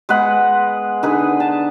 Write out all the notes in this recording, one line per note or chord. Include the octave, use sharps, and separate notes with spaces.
G#3 B3 B4 F#5
D3 D#4 G#4 B4
A5